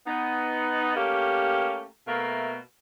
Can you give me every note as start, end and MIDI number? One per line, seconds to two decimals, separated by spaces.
0.07 0.95 59
0.07 0.95 63
0.97 1.85 57
0.97 1.85 58
0.97 1.85 61
0.97 1.85 67
2.07 2.56 47
2.07 2.56 57
2.07 2.56 58
2.07 2.56 76
2.07 2.56 77